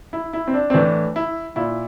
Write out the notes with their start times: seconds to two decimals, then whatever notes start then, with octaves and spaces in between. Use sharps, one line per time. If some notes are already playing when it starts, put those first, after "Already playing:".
0.13 E4
0.33 E4
0.48 C4
0.54 D4
0.70 C4
0.74 A2 E3 D4
1.16 E4
1.56 A#2 E4